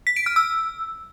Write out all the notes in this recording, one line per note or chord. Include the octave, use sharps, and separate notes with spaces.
B6
D7
F6
E6